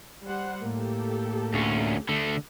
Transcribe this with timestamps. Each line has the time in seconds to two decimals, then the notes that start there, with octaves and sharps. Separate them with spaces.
0.23 G3 C5 F#5
0.62 A2 A#3 G4 A4
1.54 D2 C#4
2.09 D3 A3